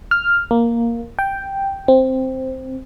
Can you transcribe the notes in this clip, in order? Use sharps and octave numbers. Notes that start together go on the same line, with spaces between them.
F6
A#3
G5
C4